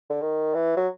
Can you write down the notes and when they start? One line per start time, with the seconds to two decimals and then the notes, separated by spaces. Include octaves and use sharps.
0.10 D3
0.21 D#3
0.54 E3
0.77 F#3